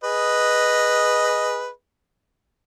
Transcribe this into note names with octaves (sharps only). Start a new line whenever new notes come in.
G#4 B4 D#5